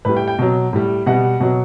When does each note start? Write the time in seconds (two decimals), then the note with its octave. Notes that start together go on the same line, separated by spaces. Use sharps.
0.05 A2 G3 B4
0.17 G5
0.28 G5
0.39 B2 F#3
0.73 A2 G3
1.06 B2 G3 F#5
1.40 B2 F#3